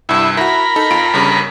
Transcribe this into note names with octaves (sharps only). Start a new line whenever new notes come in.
C2 G2 E4
E4 F#4 A#4 B5
D#4 A4
F2 F4 D7
G1 G2 C#3